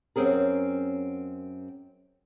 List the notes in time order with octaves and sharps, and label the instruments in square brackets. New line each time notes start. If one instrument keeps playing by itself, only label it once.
[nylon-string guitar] F#2 C4 C#4 G#4 A#4